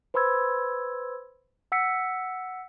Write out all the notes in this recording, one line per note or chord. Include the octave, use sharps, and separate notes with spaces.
B4 C5 B5 C6 E6 G#6
F#5 E6 B6 C#7